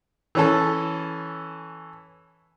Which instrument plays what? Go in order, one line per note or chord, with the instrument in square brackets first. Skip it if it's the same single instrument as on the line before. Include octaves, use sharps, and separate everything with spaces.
[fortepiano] E3 C#4 A4